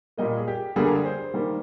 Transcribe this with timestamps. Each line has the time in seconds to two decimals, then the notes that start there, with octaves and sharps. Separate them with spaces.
0.18 A#2 G3 A#3 D#5
0.37 G#4
0.48 G4
0.76 D3 G3 A#3 G#4
0.86 A#4
0.95 G#4
1.05 C5
1.34 D#3 G3 A#3